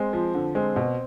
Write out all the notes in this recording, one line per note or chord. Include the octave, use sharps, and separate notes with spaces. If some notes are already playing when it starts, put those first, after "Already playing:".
Already playing: G#3 C4
F3
D3
G#3 C4
B2